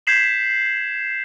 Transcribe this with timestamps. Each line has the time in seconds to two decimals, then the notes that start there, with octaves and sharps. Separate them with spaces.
0.07 G6 G#6 B6 C7 E7 F#7